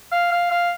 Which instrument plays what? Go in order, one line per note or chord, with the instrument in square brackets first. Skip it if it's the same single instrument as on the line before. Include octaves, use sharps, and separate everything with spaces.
[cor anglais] F5
F5
F5